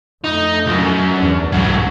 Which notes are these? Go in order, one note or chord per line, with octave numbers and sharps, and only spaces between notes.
F2 A3 D#4
C#2 F#2
E2 D4
C2 G#2 F#3